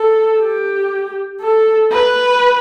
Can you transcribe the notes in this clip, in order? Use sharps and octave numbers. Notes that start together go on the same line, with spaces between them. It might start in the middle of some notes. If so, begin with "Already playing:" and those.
Already playing: A4
G4
A4
B4